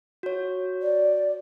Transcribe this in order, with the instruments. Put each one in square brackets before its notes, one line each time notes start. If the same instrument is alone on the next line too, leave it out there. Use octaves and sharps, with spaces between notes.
[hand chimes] F#4 C#5
[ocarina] D5